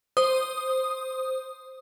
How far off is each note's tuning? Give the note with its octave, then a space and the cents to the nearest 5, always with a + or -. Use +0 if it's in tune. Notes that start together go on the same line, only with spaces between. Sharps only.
C5 +0 D#6 +0